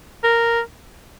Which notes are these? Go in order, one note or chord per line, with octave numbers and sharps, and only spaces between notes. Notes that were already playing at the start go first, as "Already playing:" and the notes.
A#4